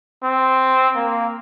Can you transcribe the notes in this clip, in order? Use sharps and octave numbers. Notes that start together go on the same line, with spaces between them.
C4
A#3